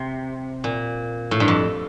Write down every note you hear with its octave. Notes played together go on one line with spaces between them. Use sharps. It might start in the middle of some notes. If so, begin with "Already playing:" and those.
Already playing: C3
A#2
A2
G2
F2